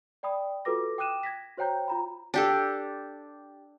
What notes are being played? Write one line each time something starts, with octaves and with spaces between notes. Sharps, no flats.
D5 G5 B5 D#6
F4 F#4 A4 B4 D6 A#6
G5 D6 D#6 F#6 D#7 E7
G#6 A#6 B6
F#4 C5 C#5 G5 A#5 G6
F4 A#5 B5
D4 G4 A4